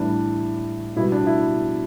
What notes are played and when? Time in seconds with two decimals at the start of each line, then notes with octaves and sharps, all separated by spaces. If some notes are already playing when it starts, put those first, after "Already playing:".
Already playing: A2 E3 G3 D4
0.96 B2 G3 B3 E4
1.12 D4
1.27 E4